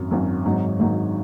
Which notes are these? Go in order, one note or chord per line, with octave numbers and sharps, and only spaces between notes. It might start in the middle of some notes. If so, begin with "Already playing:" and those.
Already playing: G#1 F#2 F#3
G#1 F#2 F#3
G#1 G#2 F#3 D#4
G#1 G#2 F#3 D#4